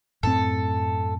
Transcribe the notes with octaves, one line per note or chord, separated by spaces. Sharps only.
F#2 A2 C4 A4